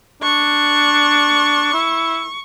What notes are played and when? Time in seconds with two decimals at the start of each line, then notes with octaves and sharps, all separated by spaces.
0.23 D4 C#6
1.74 E4